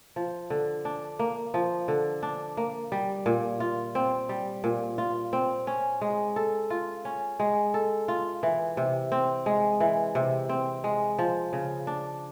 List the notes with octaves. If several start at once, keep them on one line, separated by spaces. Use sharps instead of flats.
F3
D3
D4
A#3
F3
D3
D4
A#3
G3
A#2
F4
C4
G3
A#2
F4
C4
C#4
G#3
A4
F4
C#4
G#3
A4
F4
E3
C3
C4
G#3
E3
C3
C4
G#3
F3
C#3
D4